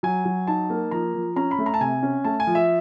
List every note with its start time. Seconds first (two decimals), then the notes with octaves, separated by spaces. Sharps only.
0.03 F#3 G#5
0.25 F#3
0.47 D#4 A5
0.70 A#3
0.91 F3 A#5
1.14 F3
1.36 C#4 A#5
1.51 B5
1.59 A3
1.66 A#5
1.74 A5
1.81 C3 G#5
2.03 C#4
2.24 A3 A5
2.40 G#5
2.47 F3
2.55 E5